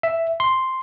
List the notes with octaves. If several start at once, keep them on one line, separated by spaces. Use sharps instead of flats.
E5
C6